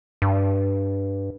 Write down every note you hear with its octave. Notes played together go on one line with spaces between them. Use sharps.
G2